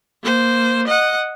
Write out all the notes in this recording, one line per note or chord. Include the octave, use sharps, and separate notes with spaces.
A#3 C5
D#5 F#5